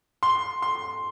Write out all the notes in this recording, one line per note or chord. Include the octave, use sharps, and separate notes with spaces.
C6
C6